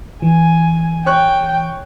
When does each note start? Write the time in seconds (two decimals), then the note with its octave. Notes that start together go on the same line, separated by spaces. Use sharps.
0.22 E3 G#5
1.06 C#5 G5 C#6 F#6